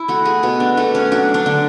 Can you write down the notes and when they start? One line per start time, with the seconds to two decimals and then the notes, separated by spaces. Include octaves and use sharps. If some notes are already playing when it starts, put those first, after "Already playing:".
Already playing: E4
0.08 A3 F#4
0.25 G#4
0.43 B2 F#4
0.60 D4
0.77 A3 F#4
0.95 C#4
1.12 F#3 D4
1.34 D4
1.46 D3